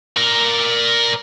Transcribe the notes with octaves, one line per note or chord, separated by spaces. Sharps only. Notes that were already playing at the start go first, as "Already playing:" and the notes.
A#4 D5